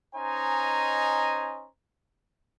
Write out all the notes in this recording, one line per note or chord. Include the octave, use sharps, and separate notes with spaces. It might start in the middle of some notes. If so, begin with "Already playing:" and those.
C#4 D#4 C5 D#5 G#5 A#5